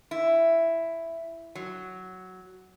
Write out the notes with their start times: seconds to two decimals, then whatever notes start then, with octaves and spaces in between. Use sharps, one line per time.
0.11 E4
1.55 F#3